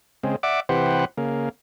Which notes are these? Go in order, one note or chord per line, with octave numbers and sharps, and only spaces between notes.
C#3 G#3 C4
D5 E5 F#5 D6
C3 E3 G4 B4 C5 F#5
C#3 A#3